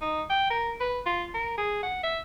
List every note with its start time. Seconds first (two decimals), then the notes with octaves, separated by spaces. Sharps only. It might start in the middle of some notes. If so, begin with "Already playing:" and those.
0.01 D#4
0.30 G5
0.50 A#4
0.80 B4
1.06 F4
1.34 A#4
1.58 G#4
1.83 F#5
2.03 E5